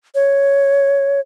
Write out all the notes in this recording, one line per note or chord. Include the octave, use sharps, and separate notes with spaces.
C#5